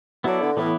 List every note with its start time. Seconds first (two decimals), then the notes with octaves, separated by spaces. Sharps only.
0.24 F#3 B3 E4 A4 D5
0.41 D3
0.57 A2 E3 B3 E4